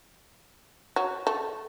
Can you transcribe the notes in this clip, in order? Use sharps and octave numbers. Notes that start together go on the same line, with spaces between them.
F#3
A3